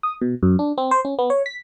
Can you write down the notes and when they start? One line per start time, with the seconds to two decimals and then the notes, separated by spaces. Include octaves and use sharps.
0.03 D#6
0.21 B2
0.43 F#2
0.59 D4
0.78 C4
0.91 C5
1.05 C#4
1.19 B3
1.30 C#5
1.46 B6